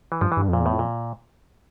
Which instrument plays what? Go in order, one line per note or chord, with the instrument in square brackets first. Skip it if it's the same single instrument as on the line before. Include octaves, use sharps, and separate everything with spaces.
[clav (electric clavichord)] E3
[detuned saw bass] G2 [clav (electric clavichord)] F3
[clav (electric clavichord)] E3
[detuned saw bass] G2
[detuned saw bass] F2 [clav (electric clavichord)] A#2
[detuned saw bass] E2 [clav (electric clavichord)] A2
[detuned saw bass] F2
[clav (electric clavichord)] A#2